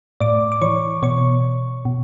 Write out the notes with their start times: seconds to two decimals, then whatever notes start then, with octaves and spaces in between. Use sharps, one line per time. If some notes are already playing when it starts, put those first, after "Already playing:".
0.20 A2 D5 D6
0.52 D6
0.62 E3 C#5 C#6
1.02 B2 C#5 C#6
1.85 B2